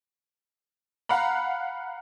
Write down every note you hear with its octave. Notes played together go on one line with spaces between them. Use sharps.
F5 F#5 A#5 B5